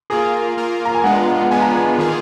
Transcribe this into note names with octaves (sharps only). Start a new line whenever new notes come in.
A#3 F4 G#4 A#4
A#3 F4 A#4
A#5
G#5
G#3 B3 D4 F4 F#5
A#5
F#5
F#5
G#3 B3 D4 F4 G#5
A#5
G#5
D#3 A#3 F4 G#4